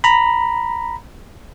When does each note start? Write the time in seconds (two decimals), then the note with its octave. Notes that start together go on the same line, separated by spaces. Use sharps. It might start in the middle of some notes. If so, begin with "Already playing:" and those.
0.04 A#5 B5